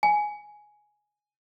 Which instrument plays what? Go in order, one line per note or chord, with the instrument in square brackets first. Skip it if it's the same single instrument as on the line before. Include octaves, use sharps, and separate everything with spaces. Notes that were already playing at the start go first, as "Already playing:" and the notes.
[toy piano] G#5